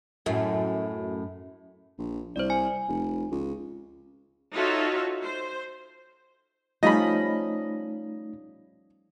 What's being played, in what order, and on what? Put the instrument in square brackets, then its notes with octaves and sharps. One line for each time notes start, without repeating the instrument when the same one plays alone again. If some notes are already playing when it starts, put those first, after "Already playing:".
[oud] F#2 A2
[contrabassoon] A#1
[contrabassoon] C2 [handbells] C5 D5
[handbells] G#5
[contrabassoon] F1
C#2
[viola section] D#4 F4 F#4 A4 C#5 E5
C5
[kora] F3 G3 C#4 [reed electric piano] A3 D#4 [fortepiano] D#5 B5